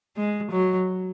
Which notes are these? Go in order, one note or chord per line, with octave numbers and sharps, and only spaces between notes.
G#3
F#3